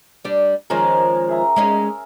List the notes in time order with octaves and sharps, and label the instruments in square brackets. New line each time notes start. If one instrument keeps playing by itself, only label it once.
[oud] G3 D4
[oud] D#3 F3 G#3 [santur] C#4 A#4
[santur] G#4 E5 A#5
[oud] G#3 C#4 D#4